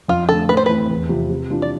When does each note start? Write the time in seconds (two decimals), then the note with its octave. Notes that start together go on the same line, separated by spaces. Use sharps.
0.08 F2 F4
0.29 D3 A3 A4
0.49 A2 B4
0.57 C5
0.66 E3 A3 C4 B4
0.90 E2
1.09 C3 F3 C4 F4
1.30 C3
1.50 E3 G3 D4 F4
1.62 D5